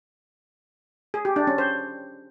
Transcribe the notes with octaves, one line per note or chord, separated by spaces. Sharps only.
G#4
G4
D4
C#4
C5